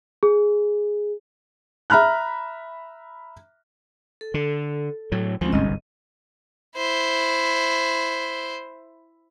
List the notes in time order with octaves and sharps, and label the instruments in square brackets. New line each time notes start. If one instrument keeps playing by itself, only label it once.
[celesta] G#4
[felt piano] E5 A#5 B5 F6 F#6
[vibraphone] A4
[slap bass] D3
A2 F#3
[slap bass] D2 F3 [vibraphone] G#3 C4 C#4
[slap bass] G1 C2 G#2 [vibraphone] D#5
[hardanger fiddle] E4 C5